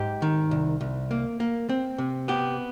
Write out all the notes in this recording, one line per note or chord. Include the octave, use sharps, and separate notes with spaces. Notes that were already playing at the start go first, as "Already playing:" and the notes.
Already playing: G#2 G4
D#3
C2
C2
A#3
A#3
C4
C3
B3 G4